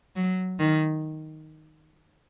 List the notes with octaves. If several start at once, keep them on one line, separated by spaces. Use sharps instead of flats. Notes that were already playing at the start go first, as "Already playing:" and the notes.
F#3
D#3